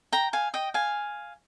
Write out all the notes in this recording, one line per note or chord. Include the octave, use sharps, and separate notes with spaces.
G5 A#5
F5 G#5
D#5 G5
F5 G#5